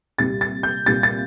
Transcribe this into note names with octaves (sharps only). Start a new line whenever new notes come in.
C2 A#2 G3 A6
A6
G6
C2 A#2 G3 A6
A6